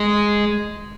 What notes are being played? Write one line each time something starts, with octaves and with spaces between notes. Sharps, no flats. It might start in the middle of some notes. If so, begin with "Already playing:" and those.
Already playing: G#3